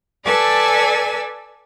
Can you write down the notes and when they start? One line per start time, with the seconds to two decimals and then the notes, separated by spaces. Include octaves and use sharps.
0.24 A4 B4 D5 G#5 E6